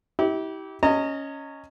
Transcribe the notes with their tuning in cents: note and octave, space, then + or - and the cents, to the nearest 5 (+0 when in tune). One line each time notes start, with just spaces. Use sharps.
E4 -35 G4 -20
C#4 +0 D#5 +0 A#5 -35